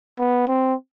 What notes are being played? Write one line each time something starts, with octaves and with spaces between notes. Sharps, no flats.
B3
C4